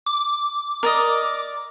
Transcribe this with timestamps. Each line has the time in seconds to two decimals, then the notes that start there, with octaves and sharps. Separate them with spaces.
0.06 D6
0.83 A#4 D5 D#5